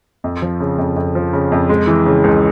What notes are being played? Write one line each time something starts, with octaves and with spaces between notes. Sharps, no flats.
F2
F3
C#3
F2
F2
F3
C#3
F2
G#3
E3
C#3
C#2